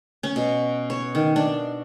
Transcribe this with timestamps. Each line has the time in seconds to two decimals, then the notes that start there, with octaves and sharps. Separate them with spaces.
0.23 C#4
0.36 B2
0.90 C#5
1.15 D#3
1.36 D4